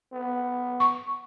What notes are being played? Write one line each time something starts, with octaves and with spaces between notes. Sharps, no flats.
B3
C#6